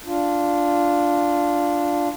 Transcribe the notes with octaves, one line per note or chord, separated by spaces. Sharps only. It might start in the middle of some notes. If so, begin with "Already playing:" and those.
D4 F4